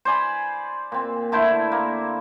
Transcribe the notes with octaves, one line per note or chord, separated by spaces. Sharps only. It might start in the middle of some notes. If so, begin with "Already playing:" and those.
C5 D5 G#5 B5
A#2 C4
D3 A3 E4 C5
A#3